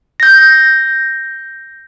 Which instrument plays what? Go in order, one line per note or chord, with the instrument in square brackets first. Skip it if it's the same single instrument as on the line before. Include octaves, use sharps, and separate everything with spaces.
[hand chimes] G6 A#6